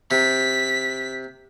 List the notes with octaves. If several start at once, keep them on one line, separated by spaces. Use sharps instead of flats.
C3 B6